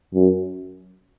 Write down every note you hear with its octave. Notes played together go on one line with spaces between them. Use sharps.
F#2